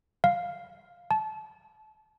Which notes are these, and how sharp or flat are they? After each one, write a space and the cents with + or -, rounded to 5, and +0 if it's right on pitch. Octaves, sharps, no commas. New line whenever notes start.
F5 +5
A5 -25